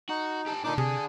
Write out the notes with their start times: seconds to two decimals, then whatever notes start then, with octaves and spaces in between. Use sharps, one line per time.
0.09 D#4 F#4
0.48 G4 A4
0.64 A#2 D4 D#4 A4 D6
0.78 C3 G#4